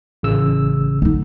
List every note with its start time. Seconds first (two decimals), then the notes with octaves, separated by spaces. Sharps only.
0.23 A1 C#3 E6
1.02 D3 D#4